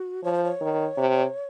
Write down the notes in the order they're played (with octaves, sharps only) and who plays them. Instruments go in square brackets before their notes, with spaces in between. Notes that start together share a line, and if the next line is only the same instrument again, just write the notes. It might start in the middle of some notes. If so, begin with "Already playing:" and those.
Already playing: [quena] F#4
[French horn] F3 [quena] C#5
[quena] C5
C#5
[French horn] D#3
C3